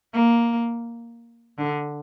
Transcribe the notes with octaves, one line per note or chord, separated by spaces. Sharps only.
A#3
D3